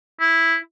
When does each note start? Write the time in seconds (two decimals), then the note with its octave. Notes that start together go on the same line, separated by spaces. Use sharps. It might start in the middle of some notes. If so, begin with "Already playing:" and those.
0.20 E4